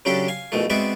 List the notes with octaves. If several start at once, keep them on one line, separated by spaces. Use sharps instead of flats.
C#3 F#3 C#4 D4 G4 A4
F5 G#5
A#1 B2 E3 A3
G#3 B3 C4 F#4 D5 E5